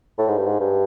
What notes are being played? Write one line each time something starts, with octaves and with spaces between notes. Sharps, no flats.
A2
G#2
G2
G#2
G2